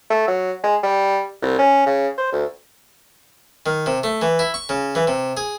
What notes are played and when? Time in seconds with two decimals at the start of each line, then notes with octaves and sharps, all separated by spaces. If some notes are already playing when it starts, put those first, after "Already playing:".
0.10 A3
0.27 F#3
0.63 G#3
0.83 G3
1.42 C2
1.58 C#4
1.86 C#3
2.18 C5
2.32 D2
3.66 D#3
3.86 C3
4.04 A3
4.22 E3
4.39 E4
4.54 C#6
4.69 C#3
4.95 E3
5.07 C3
5.37 G#4